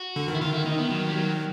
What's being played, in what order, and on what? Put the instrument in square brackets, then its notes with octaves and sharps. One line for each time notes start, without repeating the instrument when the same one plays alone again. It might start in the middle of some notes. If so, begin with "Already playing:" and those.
Already playing: [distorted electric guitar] F#4
[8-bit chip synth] D3
D#3
[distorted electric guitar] E4
[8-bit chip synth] D#3 [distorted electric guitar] F4
[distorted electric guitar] E4
D#4
B3
F#3
G3
F#3